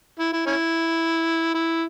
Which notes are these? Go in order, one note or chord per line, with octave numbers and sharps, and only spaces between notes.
E4
E4
C#4 E4
E4